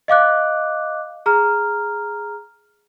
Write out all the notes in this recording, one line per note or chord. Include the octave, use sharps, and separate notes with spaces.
D#5 F5 D6 F#6
G#4 A#5 F6